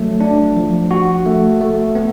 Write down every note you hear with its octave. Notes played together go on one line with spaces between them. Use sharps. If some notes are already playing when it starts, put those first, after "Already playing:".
Already playing: F#3 A3
D4
F3
F#4
A3
A3
B3